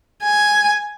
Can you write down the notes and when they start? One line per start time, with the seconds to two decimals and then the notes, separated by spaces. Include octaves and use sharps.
0.23 G#5